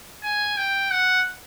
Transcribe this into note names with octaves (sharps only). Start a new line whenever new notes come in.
G#5
G5
F#5